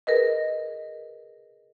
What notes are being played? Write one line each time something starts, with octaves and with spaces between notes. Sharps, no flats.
G#4 A#4 B4 D#5